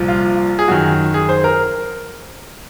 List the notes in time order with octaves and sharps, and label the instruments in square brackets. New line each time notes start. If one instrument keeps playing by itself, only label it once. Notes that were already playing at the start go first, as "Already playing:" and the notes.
Already playing: [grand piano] C2 A#2 F3
F4
G#4
F#2 D#3 F#4
G#4
C5
A#4